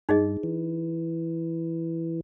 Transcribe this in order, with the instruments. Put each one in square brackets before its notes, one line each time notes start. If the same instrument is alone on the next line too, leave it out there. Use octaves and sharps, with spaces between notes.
[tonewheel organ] G2 [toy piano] D#4 G#4 D#5
[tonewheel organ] E3